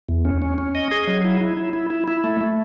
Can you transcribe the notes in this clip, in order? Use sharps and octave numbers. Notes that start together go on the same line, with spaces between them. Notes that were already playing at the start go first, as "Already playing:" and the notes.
E2
C#4
C#4
C#4
D#5
G#4
F#3
E4
E4
E4
E4
E4
E4
A3
A3